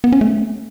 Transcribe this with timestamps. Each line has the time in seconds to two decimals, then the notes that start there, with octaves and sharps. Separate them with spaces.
0.04 B3
0.12 C#4
0.21 A3